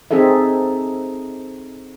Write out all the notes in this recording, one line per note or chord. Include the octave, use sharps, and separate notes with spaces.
C4 D#4 G#4 A4 E5